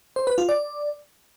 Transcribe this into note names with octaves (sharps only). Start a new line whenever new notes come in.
C5
B4
F4
D5